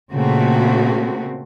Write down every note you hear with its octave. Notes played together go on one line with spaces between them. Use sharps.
A#2 C#3 A3 A#3 C4 F#4